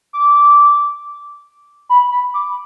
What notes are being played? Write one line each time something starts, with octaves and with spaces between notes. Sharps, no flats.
D6
B5
B5
D6